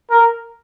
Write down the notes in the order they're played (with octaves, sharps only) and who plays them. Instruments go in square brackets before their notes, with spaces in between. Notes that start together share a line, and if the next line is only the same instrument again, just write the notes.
[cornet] A#4